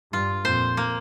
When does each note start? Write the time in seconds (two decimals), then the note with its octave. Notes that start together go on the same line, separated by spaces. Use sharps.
0.13 G2 F4
0.45 F2 A#2 C5
0.77 A#3